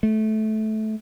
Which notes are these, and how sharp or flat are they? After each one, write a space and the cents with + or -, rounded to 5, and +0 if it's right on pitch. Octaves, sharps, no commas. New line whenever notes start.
A3 -20